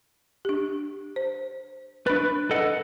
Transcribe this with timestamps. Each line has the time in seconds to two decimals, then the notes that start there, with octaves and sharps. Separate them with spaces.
0.45 D4 G4
1.16 C5
2.07 D4 B4 B5 A6
2.51 A4 D#5 F#5